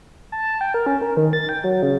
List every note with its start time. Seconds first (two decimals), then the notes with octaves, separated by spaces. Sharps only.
0.32 A5
0.61 G5
0.74 A#4
0.86 C#4
1.01 A#4
1.17 D#3
1.33 A6
1.49 G5
1.64 F#3
1.83 C#3